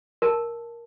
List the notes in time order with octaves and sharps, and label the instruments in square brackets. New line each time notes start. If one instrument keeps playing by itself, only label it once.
[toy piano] A#4 A5